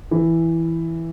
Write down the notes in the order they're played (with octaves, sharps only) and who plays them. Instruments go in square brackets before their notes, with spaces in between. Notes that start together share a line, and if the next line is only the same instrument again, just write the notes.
[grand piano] E3